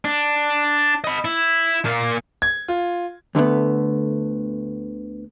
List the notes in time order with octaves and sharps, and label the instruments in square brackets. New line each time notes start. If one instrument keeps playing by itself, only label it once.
[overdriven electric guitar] D4
D#5 B5
E4
A#2 A#3
[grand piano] G#6
F4
[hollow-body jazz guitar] D2 D3 A3 B3